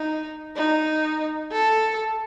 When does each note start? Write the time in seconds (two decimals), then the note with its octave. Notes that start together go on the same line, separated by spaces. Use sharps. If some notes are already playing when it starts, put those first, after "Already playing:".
Already playing: D#4
0.56 D#4
1.52 A4